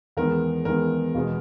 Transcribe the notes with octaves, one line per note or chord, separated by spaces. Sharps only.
E2 D#3 G#3 B3 A#4
E2 D#3 G#3 B3 A#4
E2 B2 G#3 B3